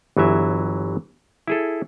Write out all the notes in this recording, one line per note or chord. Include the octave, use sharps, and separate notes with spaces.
G1 E3 F#3 E5
E4 G#4 A4